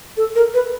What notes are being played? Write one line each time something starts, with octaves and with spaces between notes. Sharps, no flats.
A4
A#4
B4